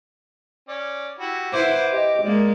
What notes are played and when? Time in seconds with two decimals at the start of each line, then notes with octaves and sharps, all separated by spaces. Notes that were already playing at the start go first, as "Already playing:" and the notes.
0.69 C#4 D5
1.19 E4 F#4 G4
1.53 E4 B4 C5 F#5 D6
1.91 G4 D#5
2.22 G#3 A#3 D5